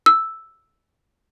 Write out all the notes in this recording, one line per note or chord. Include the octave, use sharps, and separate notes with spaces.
E6